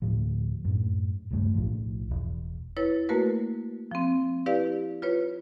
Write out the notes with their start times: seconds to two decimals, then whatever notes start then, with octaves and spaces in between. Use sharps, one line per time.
0.02 D2 A2 F3
0.65 F#2 A2
1.30 D#1 C#2 G2 A3
1.55 B1 A2 F3
2.11 E1
2.77 E4 B4 C#5 A6
3.09 A3 A#3 F#4 A#4 B4
3.91 F3 C4
4.46 E4 G4 B4 D5 F5
5.02 F4 B4 C#5